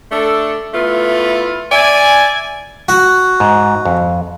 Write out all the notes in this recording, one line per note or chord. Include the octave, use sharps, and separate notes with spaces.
A3 D4 A4
A3 B3 E4 F4
D5 E5 G#5
F#4
G#2
F2